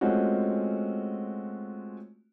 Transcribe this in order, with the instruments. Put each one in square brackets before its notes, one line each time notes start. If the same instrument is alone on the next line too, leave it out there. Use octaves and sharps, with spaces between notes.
[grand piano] G#3 A3 C4 C#4 F4 F#4